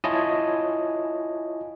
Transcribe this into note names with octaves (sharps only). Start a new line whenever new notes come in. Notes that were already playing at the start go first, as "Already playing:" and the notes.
E4 F4 C#5 D#5 G#5 A5